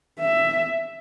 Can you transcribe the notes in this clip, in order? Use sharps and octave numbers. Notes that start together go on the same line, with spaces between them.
E5